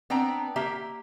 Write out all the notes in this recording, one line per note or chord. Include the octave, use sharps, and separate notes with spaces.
B3 C4 D4 G5 A#5
A#3 G4 E5 A#5